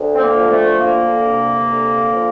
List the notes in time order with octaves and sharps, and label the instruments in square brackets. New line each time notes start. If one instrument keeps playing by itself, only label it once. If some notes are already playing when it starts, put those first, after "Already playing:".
Already playing: [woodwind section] D2
C4
A#3
F3
A3
D2 A#3
C3
D2
F3